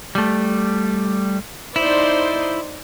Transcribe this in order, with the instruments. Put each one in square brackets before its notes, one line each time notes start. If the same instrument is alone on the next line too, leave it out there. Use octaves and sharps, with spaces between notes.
[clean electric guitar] G3 A3
[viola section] D#4 C5 D5 [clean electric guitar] E4